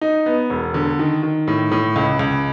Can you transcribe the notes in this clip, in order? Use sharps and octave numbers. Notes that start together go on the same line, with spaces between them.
D#4
B3
E1
D3
D#3
D#3
A2
A2
C#2
C#2